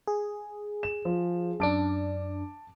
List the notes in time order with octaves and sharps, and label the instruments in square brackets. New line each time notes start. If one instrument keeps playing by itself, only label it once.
[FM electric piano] G#4
[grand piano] E7
F3
[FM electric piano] F#2 D4 [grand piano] A5 D6 D7